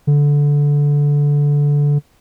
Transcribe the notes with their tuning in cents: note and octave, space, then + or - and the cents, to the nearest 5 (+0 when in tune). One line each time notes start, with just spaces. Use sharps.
D3 -15